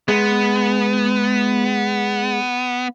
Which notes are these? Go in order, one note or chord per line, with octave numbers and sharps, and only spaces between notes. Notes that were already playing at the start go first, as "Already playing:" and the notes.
G#3 B3